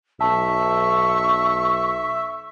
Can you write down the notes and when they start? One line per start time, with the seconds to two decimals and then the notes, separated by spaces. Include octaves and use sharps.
0.21 B1 E5 A5 C#6